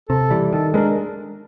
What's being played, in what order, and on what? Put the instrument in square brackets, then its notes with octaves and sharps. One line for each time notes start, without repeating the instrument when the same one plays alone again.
[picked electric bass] C3 [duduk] A4
[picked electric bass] E3 G3
[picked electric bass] D#3 [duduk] A4
[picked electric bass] G#3 B3 D4 [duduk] A#4